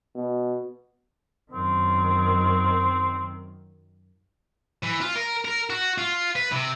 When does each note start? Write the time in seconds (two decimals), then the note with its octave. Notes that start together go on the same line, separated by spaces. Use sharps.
0.15 B2
1.52 F#2 D#3 C4
4.83 E3
5.01 F4
5.15 A#4
5.45 A#4
5.70 F#4
5.98 F4
6.36 B4
6.52 C3